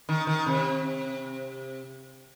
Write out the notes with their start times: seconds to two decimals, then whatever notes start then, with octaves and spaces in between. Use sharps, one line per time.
0.09 D#3
0.27 D#3
0.46 C3